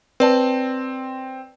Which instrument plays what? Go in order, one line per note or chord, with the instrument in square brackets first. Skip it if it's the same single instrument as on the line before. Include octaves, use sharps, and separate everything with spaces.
[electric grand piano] C4 [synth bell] B4 D5 A5